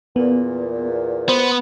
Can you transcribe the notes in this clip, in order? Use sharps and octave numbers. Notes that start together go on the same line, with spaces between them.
E2 A#2 B3
B3 C5